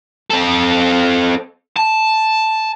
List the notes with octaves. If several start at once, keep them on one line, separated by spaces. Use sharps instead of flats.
C4 A4
A5